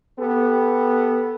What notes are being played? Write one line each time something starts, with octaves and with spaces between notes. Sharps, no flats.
B3 G4 A4 B4